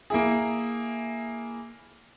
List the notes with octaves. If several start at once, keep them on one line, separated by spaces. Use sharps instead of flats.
A#3 E4 G#4